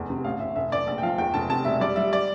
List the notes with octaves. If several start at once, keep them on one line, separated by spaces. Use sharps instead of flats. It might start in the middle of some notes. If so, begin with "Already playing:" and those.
Already playing: F1 E2
C3
A1 F5
A1 E5
F1 E5
F1 D5
A#1
G5
F3 F5
E2 G5
F1 A5
C3 A5
E1 E5
G3 D5
G3 E5
D5